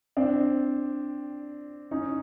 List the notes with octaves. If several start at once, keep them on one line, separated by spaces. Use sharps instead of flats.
C4 D4
C#4 D#4